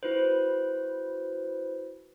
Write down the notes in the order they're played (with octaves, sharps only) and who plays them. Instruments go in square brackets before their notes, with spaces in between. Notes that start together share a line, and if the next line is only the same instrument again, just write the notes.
[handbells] E4 F#4 B4 C5